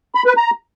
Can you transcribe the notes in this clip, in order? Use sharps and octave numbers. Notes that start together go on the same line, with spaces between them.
B5
B4
A#5